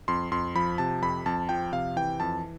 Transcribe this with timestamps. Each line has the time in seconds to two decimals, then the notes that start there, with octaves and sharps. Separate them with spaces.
0.08 F2 C6
0.32 F2 C6
0.55 F3 B5
0.78 C3 A5
1.02 F2 B5
1.26 F2 A5
1.49 F3 G5
1.72 C3 F5
1.96 E3 G5
2.20 F2 A5